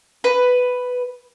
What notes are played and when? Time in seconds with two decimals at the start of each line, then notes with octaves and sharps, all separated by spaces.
0.24 B4